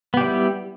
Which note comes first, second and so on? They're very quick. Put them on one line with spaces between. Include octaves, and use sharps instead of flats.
B3 G4 G3 E4